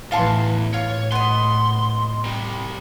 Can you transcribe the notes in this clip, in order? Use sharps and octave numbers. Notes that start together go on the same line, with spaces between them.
A1 E2 E3 F5 A5 C6
A2 F4 C#5
B3 D#5 C6
C3 G3